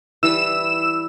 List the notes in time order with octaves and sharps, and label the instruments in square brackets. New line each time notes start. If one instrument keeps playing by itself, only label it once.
[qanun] E3 G3 B4 [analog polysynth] E6 E7